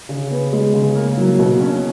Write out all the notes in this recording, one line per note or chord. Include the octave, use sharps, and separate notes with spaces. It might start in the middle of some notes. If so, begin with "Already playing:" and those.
C#3
B3
G#3
C#3
A#3
F#3
B2
C#4